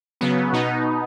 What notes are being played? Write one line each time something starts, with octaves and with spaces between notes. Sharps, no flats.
C#3 F#3 B3
B2 B3 D#4